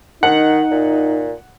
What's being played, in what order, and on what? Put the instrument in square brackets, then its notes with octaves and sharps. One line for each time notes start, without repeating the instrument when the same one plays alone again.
[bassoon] D#3 [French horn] D#4 [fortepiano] F#5
[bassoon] A#2